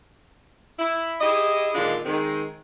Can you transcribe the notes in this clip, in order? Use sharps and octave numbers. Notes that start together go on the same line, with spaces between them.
E4
E4 G4 G#4 D#5
A#2 D3 D#3 G#3 D4 F4
D#3 G#3 C4